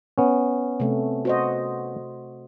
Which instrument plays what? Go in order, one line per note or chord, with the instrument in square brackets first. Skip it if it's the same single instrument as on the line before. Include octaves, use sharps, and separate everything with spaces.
[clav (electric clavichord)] B3 C#4
[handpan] C3 A3
F#4 C5 D#5